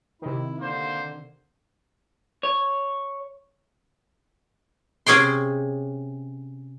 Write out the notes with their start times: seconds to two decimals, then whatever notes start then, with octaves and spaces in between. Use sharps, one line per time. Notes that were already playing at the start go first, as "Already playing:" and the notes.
0.22 C3 D#3 E4
0.59 D3 A#3 C5
2.43 C#5
5.06 C3 C#4 G#4 G5 C6